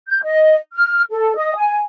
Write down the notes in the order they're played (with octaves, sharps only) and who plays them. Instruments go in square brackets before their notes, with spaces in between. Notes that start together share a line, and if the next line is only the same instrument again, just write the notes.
[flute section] G6
D#5
F6
A4
D#5 D#6
G#5